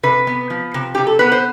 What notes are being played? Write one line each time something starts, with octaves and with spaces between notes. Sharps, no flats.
C3 B4
B3
F3
C3
C3 G4
A4
B3 B4
C5